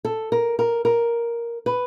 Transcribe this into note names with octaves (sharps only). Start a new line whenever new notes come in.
A4
A#4
A#4
A#4
B4